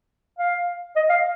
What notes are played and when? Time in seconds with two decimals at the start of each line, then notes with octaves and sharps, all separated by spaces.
0.39 F5
0.96 D#5
1.10 F5